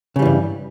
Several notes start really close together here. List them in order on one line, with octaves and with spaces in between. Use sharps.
C#3 G3 E3 G2